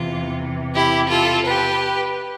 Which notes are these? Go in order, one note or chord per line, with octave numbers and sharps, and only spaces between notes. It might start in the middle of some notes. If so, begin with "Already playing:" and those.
Already playing: E2 C3 E3 F4
E4 G4
F4 A4
G4 B4